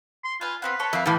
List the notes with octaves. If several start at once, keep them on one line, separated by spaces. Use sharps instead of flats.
C6
F4 B4 G#5
B3 C4 B4 F5
A4 C#5
F2 F4 A#4 E5
A2 E3 G4 A4 D#5 F5